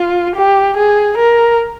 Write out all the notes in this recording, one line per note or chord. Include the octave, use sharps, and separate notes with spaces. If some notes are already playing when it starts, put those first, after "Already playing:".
Already playing: F4
G4
G#4
A#4